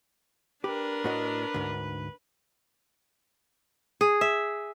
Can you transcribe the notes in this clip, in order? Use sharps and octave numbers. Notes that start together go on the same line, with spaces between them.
D4 G4 A#4 B4
A2 F#4 D#5
D2 G#2
G#4
E5